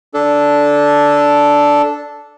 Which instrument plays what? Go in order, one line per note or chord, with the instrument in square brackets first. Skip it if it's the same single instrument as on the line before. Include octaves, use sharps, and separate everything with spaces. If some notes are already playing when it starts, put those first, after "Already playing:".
[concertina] D4 A4